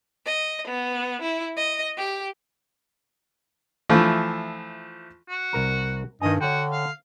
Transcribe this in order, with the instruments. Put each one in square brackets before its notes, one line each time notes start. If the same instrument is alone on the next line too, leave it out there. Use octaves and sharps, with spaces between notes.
[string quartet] D#5
B3
E4
D#5
G4
[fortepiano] E3 F3 A3
[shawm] F#4
[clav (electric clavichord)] C2 A#4 A#5
[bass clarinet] G2 [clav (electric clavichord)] D#3 G#5 [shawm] D#5
[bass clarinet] D3 [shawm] F#4 [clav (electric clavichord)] C#5 G5
[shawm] F5